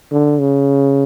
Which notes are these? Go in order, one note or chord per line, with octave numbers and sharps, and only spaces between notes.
D3
C#3